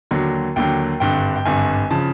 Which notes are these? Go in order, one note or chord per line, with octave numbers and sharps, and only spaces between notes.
D#2 D3 F#3
D#2 D3 F#3 G5
G#1 G2 D3 G5
G5
G#1 G2 D3 G#5
C#3 F3 A5